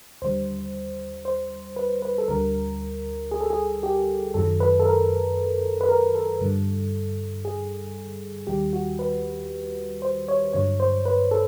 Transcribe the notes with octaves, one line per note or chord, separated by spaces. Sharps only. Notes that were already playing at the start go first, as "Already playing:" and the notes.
D#2 D3 G3 C5
C5
B4
B4
A4
D2 D3 G3 A#4
G#4
A4
G#4
G4
F#2 D#3 F#3 A4
B4
A4
A#4
B4
A#4
A4
G2 D3 G3
G#4
D#2 D#3 G3 G4
F#4
B4
C5
C#5
G2 D3 F#3 C#5
C5
B4
A4